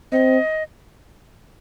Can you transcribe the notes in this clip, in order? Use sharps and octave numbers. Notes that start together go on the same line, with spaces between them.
C4 D#5